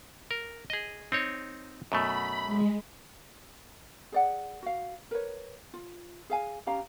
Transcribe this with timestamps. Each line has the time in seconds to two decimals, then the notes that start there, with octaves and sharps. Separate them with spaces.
0.31 A#4
0.70 G#4 D#5
1.12 C4 D#4 C#5
1.92 F#2 B2 A3 B5
2.44 G#3
4.12 G#4 D5 F#5
4.63 F#4 F5
5.11 A#4 B4 C#5
5.74 F4
6.30 G#4 F5 G#5
6.67 C#4 G4 F5 A#5